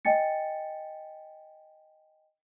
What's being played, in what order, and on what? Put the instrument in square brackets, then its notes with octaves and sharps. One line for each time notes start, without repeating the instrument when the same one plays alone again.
[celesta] D#5 G5 G#5 A6 C#7